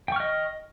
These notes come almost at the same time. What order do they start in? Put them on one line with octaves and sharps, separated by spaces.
G5 C#6 F6 D#5